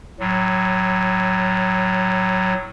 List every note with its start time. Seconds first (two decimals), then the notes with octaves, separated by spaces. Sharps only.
0.19 A2 F#3